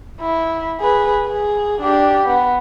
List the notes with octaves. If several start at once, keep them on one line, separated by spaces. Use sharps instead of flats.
E4
G#4 B4
G#4
D4 G4
B3